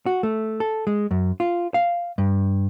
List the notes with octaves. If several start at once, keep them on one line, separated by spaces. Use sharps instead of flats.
F#4
A3
A4
G#3
F#2
F4
F5
G2